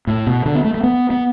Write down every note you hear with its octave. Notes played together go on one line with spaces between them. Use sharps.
A2
B2
D3
B3
A3
A3
B3
B3